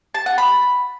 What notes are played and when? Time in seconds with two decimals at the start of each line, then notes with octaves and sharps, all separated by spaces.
0.15 A5
0.26 F#5
0.38 B5